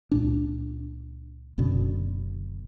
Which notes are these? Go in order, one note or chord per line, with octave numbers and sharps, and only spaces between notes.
C#2 A#2 D4
F#1 F#2 B2 D3